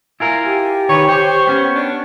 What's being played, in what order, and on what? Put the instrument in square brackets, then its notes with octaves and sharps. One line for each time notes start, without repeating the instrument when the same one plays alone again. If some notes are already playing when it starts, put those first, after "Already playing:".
[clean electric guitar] E4 F4 A#4 [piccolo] G#5
[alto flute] G4
[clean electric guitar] D#3 B4 [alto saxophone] C#5 [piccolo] C#6
[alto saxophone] C5 [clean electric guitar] C#5
[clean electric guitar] B3 C#4
[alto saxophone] D4